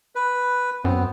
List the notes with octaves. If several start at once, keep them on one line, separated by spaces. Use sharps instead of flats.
B4
F#2 B3 C4